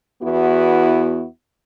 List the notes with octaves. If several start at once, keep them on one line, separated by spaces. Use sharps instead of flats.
E2 B3 E4 F#4